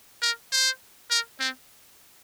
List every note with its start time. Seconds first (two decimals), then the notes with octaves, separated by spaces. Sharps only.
0.22 A#4
0.52 C5
1.10 A#4
1.40 C4